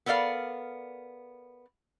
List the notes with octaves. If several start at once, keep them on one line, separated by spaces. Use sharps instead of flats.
B3 A4 A#4 D5 F5